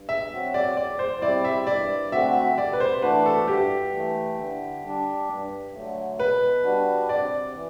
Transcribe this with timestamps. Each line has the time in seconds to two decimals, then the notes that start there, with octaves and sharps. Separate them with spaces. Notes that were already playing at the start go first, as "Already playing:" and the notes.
Already playing: G2
0.09 E5
0.32 F#3 C4 F#4
0.54 D5
0.77 E2 D5
0.99 C5
1.22 C3 G3 C4 E4 D5
1.44 E5
1.67 G2 D5
2.12 D3 A3 C4 F#4 E5
2.57 C3 D5
2.73 B4
2.80 C5
3.02 E3 A3 D4 F#4 B4
3.26 A4
3.48 G2 G4
3.93 E3 A3
4.39 D3
4.83 G3 D4
5.29 G2
5.74 D3 F#3 A3
6.19 B2 B4
6.64 G3 D4 F#4
7.09 C3 D5
7.55 E3